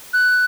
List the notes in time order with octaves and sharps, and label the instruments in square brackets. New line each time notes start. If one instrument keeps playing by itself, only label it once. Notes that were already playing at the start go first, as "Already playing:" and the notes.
[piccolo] F#6